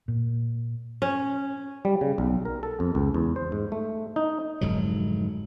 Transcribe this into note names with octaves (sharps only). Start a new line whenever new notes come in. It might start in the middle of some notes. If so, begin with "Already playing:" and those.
A#2
C#4
G3
C#3
B1
A#4
A4
F2
C#2
E2
C5
G#2
A3
D#4
F1 G#2 D3 F#3